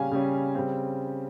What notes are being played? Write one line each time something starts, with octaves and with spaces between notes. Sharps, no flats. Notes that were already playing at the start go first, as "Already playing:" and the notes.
Already playing: C#3 G3 C#4 F5 G#5
C#3 G3 C#4
C#3 G3 C4